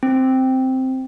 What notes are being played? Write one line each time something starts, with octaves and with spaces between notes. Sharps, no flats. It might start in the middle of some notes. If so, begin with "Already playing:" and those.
C4